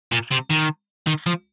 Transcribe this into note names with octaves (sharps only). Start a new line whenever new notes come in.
A#2
C3
D#3
D#3
F3